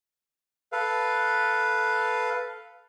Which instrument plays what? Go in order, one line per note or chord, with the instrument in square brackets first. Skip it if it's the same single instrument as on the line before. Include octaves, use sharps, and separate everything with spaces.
[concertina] A4 B4 F5